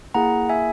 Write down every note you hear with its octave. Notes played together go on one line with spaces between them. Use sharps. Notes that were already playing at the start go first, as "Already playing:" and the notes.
A#3 E4 G#4 F#5 A#5
E5 G#5